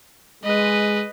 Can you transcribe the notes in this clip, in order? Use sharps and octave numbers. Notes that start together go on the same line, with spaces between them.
G#3 B4 D#5